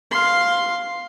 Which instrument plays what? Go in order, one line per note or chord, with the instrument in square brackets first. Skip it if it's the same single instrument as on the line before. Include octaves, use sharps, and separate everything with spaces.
[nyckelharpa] F5 C6